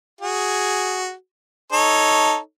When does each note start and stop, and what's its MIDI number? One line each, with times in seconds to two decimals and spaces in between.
0.21 1.12 66
0.21 1.12 68
1.72 2.37 63
1.72 2.37 69
1.72 2.37 73